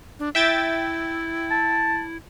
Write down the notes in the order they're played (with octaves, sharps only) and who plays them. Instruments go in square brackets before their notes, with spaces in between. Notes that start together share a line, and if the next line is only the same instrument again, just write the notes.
[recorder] D4
[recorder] E4 [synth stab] E5 G5 A6
[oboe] A5